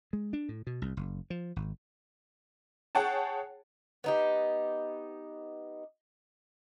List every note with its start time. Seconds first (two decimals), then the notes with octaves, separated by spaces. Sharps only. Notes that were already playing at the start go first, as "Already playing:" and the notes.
0.13 G#3
0.33 D4
0.49 A2
0.67 B2
0.82 C2
0.97 F#1
1.30 F3
1.56 G#1
2.95 G#4 C#5 F#5 G5 A5
4.04 B3 D#4 G4